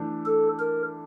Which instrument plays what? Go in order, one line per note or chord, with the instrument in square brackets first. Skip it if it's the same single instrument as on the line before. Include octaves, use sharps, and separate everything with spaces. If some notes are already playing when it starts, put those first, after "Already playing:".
Already playing: [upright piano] E3 A3 D4
[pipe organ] A4
A#4